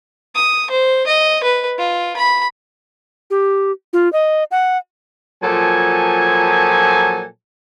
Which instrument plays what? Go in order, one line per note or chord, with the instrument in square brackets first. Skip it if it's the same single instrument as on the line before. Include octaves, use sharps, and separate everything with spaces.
[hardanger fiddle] D#6
C5
D#5
B4
F4
B5
[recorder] G4
F4
D#5
F#5
[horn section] A#2 F3 F#3 A4 G#5